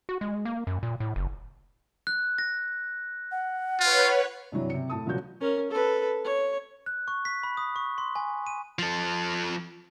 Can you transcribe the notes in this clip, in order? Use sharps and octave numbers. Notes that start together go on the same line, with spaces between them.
F#4
G#3
A#3
F#2
A#2
A2
F#1
F#6
A#6
F#5
F4 B4 C#5
G2 C3 E3 F#3
C3 C#7
A2 A5 D#6
E1 C#2 F3 F#3 F#4 G6
C#4 A#4
A4 B4
C#5
F#6
C#6
B6
B5
D#6
C#6
C6
G#5
D#7
F3 A4